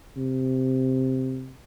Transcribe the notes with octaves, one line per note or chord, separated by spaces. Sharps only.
C3